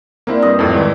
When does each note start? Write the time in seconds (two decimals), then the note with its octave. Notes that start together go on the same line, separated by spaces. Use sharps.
0.27 A#3 C4 D4 E4 A#4 C5
0.42 G2 D#5
0.59 F2 A2 A4 D5
0.74 G#2 D#3 E3